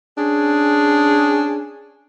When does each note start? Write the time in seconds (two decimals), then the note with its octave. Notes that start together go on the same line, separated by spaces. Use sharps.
0.18 C#4 D4 G#4